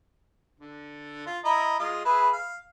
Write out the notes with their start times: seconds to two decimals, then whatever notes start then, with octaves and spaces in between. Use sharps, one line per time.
0.60 D3
1.26 F4
1.45 E4 D#5 A#5
1.79 G#3 F4 D#6
2.05 G#4 B4 E5
2.33 F5